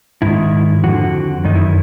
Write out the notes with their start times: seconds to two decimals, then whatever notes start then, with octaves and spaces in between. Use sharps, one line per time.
0.22 G#2 D#3 E4
0.84 F2 D3 F#4
1.45 F#2 D#3 D#4
1.55 E4
1.65 E4